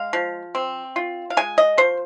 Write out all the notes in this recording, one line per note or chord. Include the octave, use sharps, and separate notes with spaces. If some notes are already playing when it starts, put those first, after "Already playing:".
Already playing: G#3 F5
F3
C4
F4
F5
G#3 G#5
D#5
F3 C5